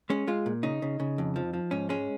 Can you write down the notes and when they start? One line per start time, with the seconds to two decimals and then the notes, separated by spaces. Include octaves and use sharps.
0.10 G#3 C#4
0.28 G#3 F4
0.46 A#2
0.63 C#3 D#4
0.82 C#3
1.00 C#3
1.18 F2
1.36 F3
1.53 F3
1.71 G#2 C#4
1.89 G#3 C#4